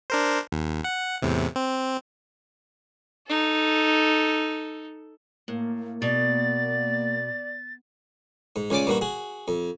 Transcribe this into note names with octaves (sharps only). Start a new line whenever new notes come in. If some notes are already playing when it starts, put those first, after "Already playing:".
D4 A#4 C5
D#2
F#5
E2 A2 C3
C4
D#4 A4
A2 A#3
B2 D5 A6
G#2
C#2 C#3 C#4 D5 D6
G2 A#3 F#4
F#4 G#4
F2